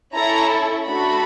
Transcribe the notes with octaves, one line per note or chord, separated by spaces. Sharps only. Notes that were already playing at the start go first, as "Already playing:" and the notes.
C#4 E4 A4 A#5
A3 D4 F#4 A4 B5